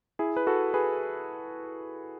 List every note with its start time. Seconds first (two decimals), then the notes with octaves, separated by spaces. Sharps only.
0.19 E4 G#4
0.37 B4
0.47 F#4 A4
0.74 G#4 B4